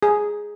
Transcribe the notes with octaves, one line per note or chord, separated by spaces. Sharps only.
G#4